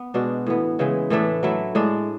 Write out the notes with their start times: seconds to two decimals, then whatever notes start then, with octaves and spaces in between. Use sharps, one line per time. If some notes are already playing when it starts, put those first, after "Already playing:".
Already playing: B3
0.14 B2 G#3 D4 F#4
0.47 A2 E3 B3
0.79 C#3 E3 G#3
1.10 A2 E3 A3 D4
1.43 F#3 A3 E4
1.75 A2 G#3 D4